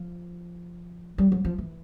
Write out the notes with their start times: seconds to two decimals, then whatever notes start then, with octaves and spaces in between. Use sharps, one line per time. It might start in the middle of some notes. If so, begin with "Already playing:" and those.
Already playing: F3
1.18 G3
1.32 F#3
1.45 F3
1.58 E3